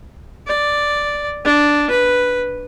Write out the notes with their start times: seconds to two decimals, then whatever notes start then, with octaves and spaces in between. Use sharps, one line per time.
0.47 D5
1.45 D4
1.90 B4